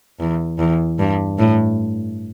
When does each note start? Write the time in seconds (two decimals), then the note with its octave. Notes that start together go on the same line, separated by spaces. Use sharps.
0.20 E2
0.59 E2
0.99 G2
1.38 A2